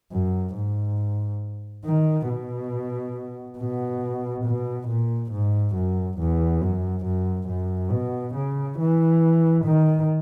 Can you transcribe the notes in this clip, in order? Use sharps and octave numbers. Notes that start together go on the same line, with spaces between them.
F#2
G#2
D#3
B2
B2
B2
A#2
G#2
F#2
E2
F#2
F#2
F#2
B2
C#3
E3
D#3